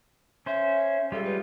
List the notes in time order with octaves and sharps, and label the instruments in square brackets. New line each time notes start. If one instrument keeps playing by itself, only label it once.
[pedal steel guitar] C#4 C5 [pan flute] E5
[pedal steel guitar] G3 G#3 F4 [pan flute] A4
[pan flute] B4